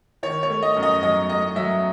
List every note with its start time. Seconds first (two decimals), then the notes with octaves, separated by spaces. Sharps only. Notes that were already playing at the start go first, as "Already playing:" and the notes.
0.23 D#3 C#5
0.43 C#5
0.50 A3
0.63 D#5
0.76 F#2
0.83 D#5
1.03 F#3 D#5
1.29 A3 D#5
1.56 F#3 E5